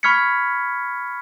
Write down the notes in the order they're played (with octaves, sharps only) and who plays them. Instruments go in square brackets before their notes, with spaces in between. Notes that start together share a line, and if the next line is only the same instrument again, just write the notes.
[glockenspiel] B5 C#6 F6 G#6 B6 C#7